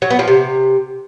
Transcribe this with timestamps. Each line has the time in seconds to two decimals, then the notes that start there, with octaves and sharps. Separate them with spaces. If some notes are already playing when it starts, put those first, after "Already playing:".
0.02 F#3
0.10 B3
0.19 F3
0.28 C3